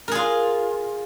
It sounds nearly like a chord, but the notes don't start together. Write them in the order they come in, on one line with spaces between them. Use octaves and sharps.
A#4 G#4 F4